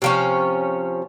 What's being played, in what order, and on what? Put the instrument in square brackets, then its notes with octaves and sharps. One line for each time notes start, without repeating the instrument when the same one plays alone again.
[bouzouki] C3 F3 C#4